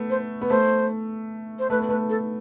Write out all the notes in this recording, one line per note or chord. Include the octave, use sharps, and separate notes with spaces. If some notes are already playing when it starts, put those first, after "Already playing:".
Already playing: A3 B3
C5
B3
A3 C5
C5
A3 B4
B3
A3 B4
A4